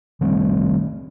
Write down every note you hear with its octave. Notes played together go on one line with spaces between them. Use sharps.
D#3 G3 A3 C4